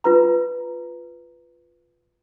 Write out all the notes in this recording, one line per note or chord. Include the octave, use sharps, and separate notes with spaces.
F4 B4 A#5